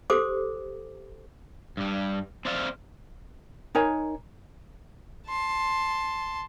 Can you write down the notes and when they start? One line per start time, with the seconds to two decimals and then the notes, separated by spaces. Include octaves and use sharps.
0.10 G4 A4 C5 D6
1.77 G2 G3
2.45 C4 D5 E5 F5
3.75 D#4 A#4 C#5 G#5
5.28 A5 C6